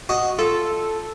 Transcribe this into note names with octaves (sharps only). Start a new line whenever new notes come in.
F#4 D#5
F4 A4